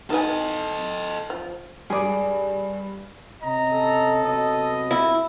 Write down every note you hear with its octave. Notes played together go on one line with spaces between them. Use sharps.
D#4 A4 B4 D#5 G#5
F3
G2 G#4 D5
C3 C#4 D#5 A#5
A4
C3 F#3 B3 D#5
E4